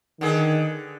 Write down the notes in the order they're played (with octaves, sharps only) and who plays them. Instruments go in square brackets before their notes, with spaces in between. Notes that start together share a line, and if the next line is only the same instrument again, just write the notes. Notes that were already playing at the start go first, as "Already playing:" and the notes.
[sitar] D3 G#4 B4 [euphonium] D#3